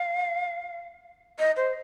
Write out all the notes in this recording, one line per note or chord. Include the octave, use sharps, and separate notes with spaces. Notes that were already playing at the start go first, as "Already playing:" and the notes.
Already playing: F5
D#5
C5